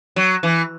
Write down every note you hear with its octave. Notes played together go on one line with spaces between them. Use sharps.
F#3
E3